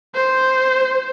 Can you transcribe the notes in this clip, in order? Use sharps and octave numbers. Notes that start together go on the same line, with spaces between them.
C5